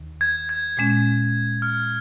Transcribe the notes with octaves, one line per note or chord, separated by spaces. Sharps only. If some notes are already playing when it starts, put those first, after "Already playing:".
Already playing: D#2 D#3
G#6
G#6
A#2 G#3 C#4
F6